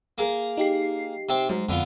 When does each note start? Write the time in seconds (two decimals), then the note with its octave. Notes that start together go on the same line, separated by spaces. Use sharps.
0.18 A#3 G#4 A#4
0.57 D#4 G4 C7
1.29 C3 C4 D6
1.49 G#2 F#3
1.69 F2 D3 B3 F4